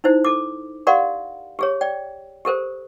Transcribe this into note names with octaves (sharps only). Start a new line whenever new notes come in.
D#4 E4 C5
A4 D6
G4 A#4 D5 F5 F#5 C6
G4 G#4 C#5
D5 G5
G4 A4 A#4 C5